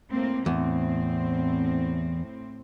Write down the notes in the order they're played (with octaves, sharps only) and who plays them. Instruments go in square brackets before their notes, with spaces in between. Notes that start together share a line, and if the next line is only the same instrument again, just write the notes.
[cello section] A2 A#3 C4
[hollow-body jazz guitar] E2 [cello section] A2 C4